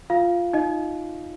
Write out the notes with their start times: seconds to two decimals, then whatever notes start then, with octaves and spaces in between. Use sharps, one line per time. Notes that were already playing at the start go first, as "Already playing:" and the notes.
0.10 F4 F5
0.53 D#4 D#5